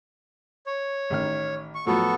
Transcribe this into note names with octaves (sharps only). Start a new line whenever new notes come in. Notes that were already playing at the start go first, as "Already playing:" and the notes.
C#5
A1 D#3 F6
C#6
A2 F3 F#3 B3 A4 C#6